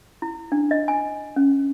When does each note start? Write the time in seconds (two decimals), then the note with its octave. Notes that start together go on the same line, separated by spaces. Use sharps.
0.22 E4
0.52 D4
0.71 D#5
0.88 G#5
1.36 C#4